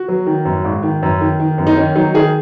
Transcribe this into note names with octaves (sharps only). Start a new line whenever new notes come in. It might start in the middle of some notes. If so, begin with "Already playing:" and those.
Already playing: F#4
F#3
D#3
F#2
G#1
D#3
F#2
D#3
D#3
F#2
D#4
D#3 C#4
F#3 D#4
D#3 G#4